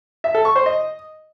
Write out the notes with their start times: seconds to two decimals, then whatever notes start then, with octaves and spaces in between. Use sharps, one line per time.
0.24 E5
0.35 A4
0.45 C#6
0.56 C5
0.66 D#5